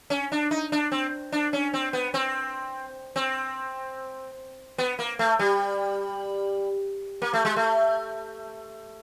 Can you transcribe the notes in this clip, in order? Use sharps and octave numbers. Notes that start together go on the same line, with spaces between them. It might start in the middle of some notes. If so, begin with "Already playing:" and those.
C#4
D4
D#4
D4
C4
D4
C#4
C4
B3
C4
C4
B3
A#3
A3
G3
A#3
A3
G#3
A3